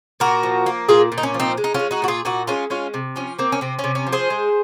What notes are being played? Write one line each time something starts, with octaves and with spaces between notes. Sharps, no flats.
A#2 F#4 A#4
F3
A#3
A#2 F4 G#4
A#2
D#4
C#4
F3
C4 D#4
G#3
D#4
G#3 C#4 F4
D#4 F#4
A#2 F#4
F4 G#4
A#2 D#4 F#4
G#3 C#4 F4
G#3 C#4 F4
C3
F3 C#4
A#3 C4
C#4
C3 C4
C#4
C3
C#4
F3
G#4 C5
G#3